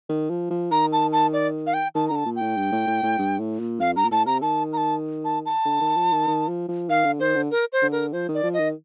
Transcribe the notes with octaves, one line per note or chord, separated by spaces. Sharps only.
D#3
F3
F3
D#3 A#5
A5
A5
D5
F5
G5
D#3 A5
D3 A#5
A5
A#2
G5
A2
G2
A2
A2
A2
G2
A2
A#2
F2 F5
G2 A#5
A#2
A2 A5
C3 A#5
D#3 A5
A#5
A5
A5
A5
D3
D#3
F3
D#3
D#3
F3
F3
D#3 F5
D3
D#3 C5
D3
A#4
C5
D3
A#4
F3 C5
D#3
D5
F3
D#5
D#3